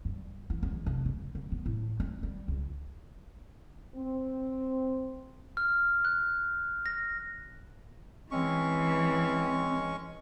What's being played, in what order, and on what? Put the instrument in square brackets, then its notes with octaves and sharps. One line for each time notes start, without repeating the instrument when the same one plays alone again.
[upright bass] G2
E3
E2
F1
C#3
C#3
B3
A2
C4
G3
C#2
[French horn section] C4
[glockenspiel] F6
F#6
A#6
[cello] E3 [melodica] G#3 C#4 C#6 [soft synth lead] C4